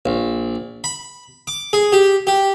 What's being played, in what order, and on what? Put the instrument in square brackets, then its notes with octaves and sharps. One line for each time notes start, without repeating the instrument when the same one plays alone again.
[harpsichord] A#1
B5
D6
G#4
G4
G4